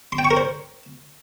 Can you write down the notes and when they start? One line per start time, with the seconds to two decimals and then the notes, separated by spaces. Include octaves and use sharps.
0.12 C6
0.18 G5
0.25 C#6
0.31 A#4
0.37 C5